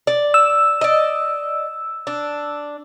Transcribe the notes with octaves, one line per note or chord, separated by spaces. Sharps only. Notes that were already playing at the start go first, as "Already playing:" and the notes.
D5
E6
D5 D#5
D4